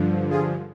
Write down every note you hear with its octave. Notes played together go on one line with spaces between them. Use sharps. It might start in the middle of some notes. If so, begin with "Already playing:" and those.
Already playing: G2 D3 F3
F4 G#4